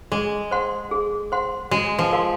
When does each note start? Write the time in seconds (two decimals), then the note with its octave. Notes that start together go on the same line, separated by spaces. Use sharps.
0.12 G#3 G#4
0.51 C5 F#5 C6
0.91 G#4
1.32 C5 F#5 C6
1.71 G#3 F#4
1.99 F3
2.13 A#4 F5 G#5 C6